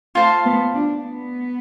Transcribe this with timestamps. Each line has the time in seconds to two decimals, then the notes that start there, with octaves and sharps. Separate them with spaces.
0.15 A3 F4 C5 F5 A5
0.45 B3
0.74 D4
1.03 B3